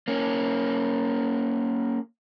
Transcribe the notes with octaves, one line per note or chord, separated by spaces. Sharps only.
A#3 C#4